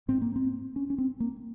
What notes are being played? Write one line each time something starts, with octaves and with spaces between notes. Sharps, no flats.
G#2 C4
A#3
C4
C#4
C#4
C4
A#3